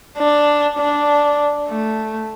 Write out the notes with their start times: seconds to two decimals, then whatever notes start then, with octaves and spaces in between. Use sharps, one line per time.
0.18 D4
0.79 D4
1.69 A3